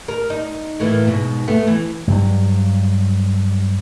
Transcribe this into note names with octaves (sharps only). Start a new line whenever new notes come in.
A#4
D#4
A2 E3 A#3
G#2 B2
A3 B3
E3
G2 F#3